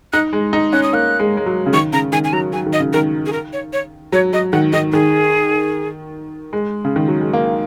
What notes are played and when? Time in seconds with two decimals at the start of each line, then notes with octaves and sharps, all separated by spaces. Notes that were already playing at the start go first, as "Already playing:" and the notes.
0.13 D#4 F#6
0.33 G#3
0.53 D#4
0.73 C#4 F#6
0.83 D#6
0.93 A#3 F#6
1.20 G#3
1.37 G#3
1.46 F#3
1.66 C#3
1.73 D#3 C#6
1.93 C#3 A#5
2.13 D#3 G#5
2.24 G#5
2.33 F#3 A#5
2.53 F#3 G#5
2.66 D#3
2.73 D#5
2.80 C#3
2.93 D#3 A#4
3.26 G#4
3.33 A#4
3.53 C#5
3.73 C#5
4.12 F#3 C#5
4.33 F#3 D#5
4.53 D#3 F#5
4.73 D#3 D#5
4.92 D#3 G#4
6.53 G#3
6.85 C#3
6.96 D#3
7.08 F#3
7.21 G#3
7.33 A#3